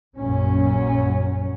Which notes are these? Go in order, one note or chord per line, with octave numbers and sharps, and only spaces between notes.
A#1 F#2 F#3 C#4